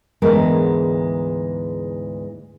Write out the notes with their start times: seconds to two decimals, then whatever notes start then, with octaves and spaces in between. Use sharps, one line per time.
0.22 D2 G#2 E3 G#3 B3 A#4